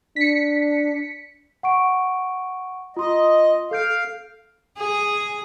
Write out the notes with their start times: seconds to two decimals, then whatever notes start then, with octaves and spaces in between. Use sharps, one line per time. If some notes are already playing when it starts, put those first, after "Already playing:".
0.16 D4 B6 C#7
1.63 F#5 C#6 D7
2.97 F4 D#5 C6
3.71 A4 F5 G6 D7
4.78 G#4